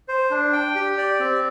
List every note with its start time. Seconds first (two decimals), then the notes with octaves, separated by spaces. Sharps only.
0.08 C5
0.31 D4
0.53 G5
0.75 G4
0.98 D5
1.20 C4